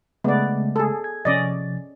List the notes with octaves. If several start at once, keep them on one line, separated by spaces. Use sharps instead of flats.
C#3 G#3 A3 B3 D5
G#4 A4
G#6
C3 F3 C#4 D5 D#5 A6